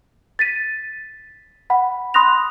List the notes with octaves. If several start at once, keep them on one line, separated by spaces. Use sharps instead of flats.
A6 B6 D#7
F#5 B5
B5 C6 D#6 F#6 A#6 F7